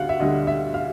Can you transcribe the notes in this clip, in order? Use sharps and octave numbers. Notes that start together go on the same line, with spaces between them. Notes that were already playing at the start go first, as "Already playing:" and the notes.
Already playing: D2 D3 G3 F5 F#5
E5
D2 D3 G3 D#5
E5
F5